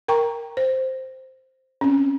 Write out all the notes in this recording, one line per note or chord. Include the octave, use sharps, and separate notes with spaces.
A#4 G5 A#5 C#6
C5
C4 C#4